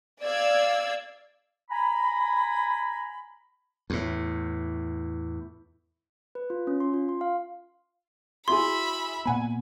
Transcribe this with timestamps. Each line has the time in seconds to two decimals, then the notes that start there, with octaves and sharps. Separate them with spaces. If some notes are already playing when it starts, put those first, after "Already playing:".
0.23 D5 F5 E6 G#6
1.70 G#5 A#5 B5
3.90 E2 A2
6.35 B4
6.50 F4
6.67 C#4
6.80 C6
6.94 F4
7.09 C6
7.21 F5
8.48 E4 F#4 G#4 E5 B5 C6
9.25 A#2 B3 F#5 G#5 B5